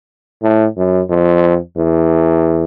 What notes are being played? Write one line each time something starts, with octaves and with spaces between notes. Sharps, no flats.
A2
F#2
F2
E2